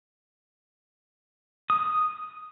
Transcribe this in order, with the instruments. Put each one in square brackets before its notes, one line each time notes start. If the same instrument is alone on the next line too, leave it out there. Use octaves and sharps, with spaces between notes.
[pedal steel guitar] D#6